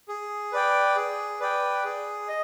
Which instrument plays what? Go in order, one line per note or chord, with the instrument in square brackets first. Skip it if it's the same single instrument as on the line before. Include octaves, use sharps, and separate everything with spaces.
[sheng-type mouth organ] G#4
B4 D5 G5
G#4
B4 D5 G5
G#4
D#5